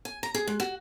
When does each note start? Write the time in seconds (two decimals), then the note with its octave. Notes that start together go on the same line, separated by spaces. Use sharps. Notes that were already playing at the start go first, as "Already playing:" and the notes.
0.05 G#5
0.23 A#5
0.35 G#4
0.47 G#3
0.60 F#4